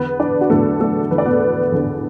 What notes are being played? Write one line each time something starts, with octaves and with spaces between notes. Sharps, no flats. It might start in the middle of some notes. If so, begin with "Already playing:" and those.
Already playing: E2 D3 B3 B4
D4 D5
F#4
E2 D3 A3 B3 A4
A3 A4
E2 D3 B3 B4
D5
B3 B4
E2 D3 B3